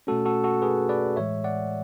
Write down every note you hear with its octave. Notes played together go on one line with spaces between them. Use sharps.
B2 A3 C#4 F#4 A4
F#4 A4
F#4 A4
G#4 B4
B4 D5
A2 E3 G#3 C#5 E5
D5 F#5